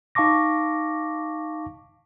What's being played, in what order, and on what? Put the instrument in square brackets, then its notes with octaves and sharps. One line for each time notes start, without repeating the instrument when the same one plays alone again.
[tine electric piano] D#4 F5 A5 C#6 D6 A#6